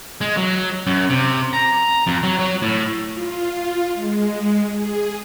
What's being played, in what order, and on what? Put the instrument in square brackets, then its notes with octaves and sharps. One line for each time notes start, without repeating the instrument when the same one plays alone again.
[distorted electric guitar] G#3
F#3
F#2
C3
A#5
F2
F#3
F#3
A2
[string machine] F4
G#3
G#4